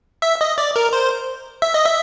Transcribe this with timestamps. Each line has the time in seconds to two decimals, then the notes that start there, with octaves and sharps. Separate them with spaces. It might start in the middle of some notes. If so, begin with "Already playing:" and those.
0.22 E5
0.41 D#5
0.58 D5
0.76 A#4
0.93 C5
1.62 E5
1.74 D#5
1.85 E5